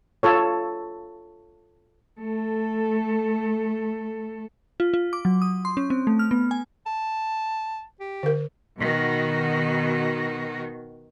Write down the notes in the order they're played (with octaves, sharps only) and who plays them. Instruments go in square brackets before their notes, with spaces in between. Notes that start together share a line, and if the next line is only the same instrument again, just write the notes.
[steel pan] F4 A4 C#5
[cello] A3 A4
[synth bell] F4
F4
D6
F#3
D#6
C6
C#4
C4
A3
F6
B3
G#5
[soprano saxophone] A5
G4
[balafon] D3 A#4
[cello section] B2 D#3 F#4